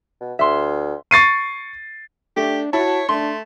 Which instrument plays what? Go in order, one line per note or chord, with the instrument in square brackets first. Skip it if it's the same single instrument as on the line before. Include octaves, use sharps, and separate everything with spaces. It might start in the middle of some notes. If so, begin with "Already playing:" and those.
[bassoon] B2
[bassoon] D2 [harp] E5 C6
[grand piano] C#6 A6 C7 D#7
[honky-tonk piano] A3 [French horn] D4 [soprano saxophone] G4
[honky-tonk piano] E4 [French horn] F#4 [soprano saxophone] C#5 [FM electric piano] A5
[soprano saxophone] A3 [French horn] D4 [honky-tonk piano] C6